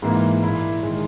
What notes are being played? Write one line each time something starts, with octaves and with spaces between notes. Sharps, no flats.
G#2 E3 A#3 E4
A#2 A#3 E4
D#3 G#3